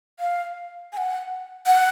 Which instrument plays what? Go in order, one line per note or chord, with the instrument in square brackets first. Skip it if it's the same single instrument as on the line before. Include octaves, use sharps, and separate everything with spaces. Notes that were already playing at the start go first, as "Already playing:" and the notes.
[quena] F5
G#5
F#5
F#5